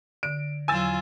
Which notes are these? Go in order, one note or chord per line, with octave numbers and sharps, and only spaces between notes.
D3 D7
E2 F#3 F4 G#5 E6 A6